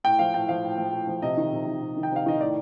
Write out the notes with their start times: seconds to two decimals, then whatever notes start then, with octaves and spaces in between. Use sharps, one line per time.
0.04 A2 G5
0.19 F3 F5
0.34 A2 G5
0.49 F3 F5
0.64 A2
0.78 F3
0.92 A2
1.07 F3
1.22 C3 D#5
1.37 D#3
1.52 C3
1.67 D#3
1.82 C3
1.97 D#3
2.03 G5
2.12 C3 F5
2.26 D#3 D#5
2.40 A2 D5